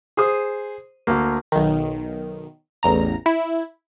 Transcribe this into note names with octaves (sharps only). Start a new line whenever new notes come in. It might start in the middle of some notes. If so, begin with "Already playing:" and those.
G#4 C5 D#6
D2 A#3
B1 D#3
A1 E2 A#5
E4